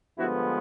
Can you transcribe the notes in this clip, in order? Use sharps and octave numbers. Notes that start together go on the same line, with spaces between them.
G2 D3 F3 G#3 B3 E4 F#4